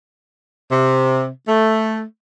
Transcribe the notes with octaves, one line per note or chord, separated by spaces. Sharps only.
C3
A3